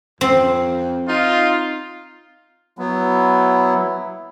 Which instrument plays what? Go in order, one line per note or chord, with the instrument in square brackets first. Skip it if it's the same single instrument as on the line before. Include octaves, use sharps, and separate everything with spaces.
[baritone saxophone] F2 [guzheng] C4
[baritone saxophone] D#4 [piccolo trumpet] F4
[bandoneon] F#3 B3 [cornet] E4